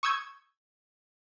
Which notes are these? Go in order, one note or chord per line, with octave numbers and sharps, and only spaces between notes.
C#6 D#6 E6 G6 G#6